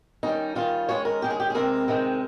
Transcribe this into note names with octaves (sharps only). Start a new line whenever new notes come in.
D#3 G3 C#4 D#4
D#3 G3 C#4 F4
D#3 G#3 C#4 C#5
A#4
D#3 G#3 C#4 G4
G#4
G4
G#4
C3 D#3 G#3 C4 A#4
C3 D#3 G#3 C4